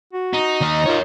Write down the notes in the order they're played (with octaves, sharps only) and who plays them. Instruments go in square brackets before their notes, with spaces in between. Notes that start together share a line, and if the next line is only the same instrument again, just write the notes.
[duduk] F#4
[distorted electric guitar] D#4
[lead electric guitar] D#2 D#5
[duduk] F4 [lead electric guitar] A#4 C#5